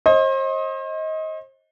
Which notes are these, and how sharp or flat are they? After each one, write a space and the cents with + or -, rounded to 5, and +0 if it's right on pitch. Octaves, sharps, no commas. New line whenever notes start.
C5 +40 D#5 +20